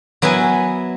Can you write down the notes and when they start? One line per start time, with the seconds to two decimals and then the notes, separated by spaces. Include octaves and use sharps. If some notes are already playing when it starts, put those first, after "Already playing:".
0.22 F#3 B3 E4 F#5 G#5